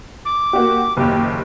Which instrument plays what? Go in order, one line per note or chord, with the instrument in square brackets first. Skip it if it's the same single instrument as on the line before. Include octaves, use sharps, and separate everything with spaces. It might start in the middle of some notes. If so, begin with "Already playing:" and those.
[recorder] D6
[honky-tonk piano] A#3 F#4 G4
[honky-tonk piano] F#1 D#2 [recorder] G4